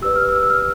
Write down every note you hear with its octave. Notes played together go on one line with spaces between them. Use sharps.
G4 B4 D5 E6
F6
E6
E6
F6